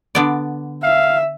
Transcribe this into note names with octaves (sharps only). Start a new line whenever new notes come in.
D3 B3 D5
E5 F5